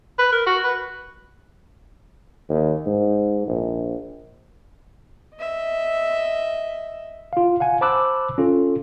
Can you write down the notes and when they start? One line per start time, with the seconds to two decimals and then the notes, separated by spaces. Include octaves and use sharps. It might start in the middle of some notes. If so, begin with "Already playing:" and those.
0.19 B4
0.32 A#4
0.46 F#4
0.64 B4
2.49 D#2
2.86 G#2
3.47 A#1
5.36 D#5 E5
7.33 F4 F5
7.60 F5 F#5 G#5
7.81 C5 A5 B5 D6 E6 F#6
8.38 C#4 F4 A4